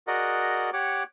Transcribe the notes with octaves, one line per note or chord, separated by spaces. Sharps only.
F#4 G#4 A#4 D5 D#5 F#5
G4 C#5 F#5 D6